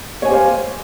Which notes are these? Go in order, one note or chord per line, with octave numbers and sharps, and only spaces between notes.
G4 C5 C#5 F5 G#5